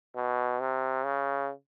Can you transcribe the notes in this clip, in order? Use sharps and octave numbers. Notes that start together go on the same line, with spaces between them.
B2
C3
C#3